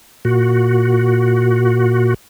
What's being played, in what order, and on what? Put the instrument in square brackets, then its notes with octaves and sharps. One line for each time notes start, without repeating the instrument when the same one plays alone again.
[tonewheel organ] A#2 F#4